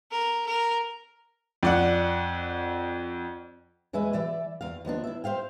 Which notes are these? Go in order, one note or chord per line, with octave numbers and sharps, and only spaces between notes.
A#4
A#4
F2 D5 F#5
E2 G#3 B4 E5 G#5
E3 D5 E5
E2 F5
D#2 F3 B3 D4
E4 E5
C5 E5 F5 G5